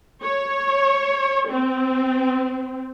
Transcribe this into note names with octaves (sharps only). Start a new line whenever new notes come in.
C#5
C4